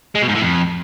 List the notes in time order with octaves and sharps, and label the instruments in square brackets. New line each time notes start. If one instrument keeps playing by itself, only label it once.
[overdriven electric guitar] G#3
B2
G#2
A2
F2